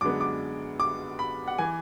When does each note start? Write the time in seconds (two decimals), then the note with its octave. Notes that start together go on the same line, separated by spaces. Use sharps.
0.01 F#2 D3 G#3 B3 D6
0.21 D6
0.80 D6
1.19 B5
1.48 F#5
1.58 E3 G#5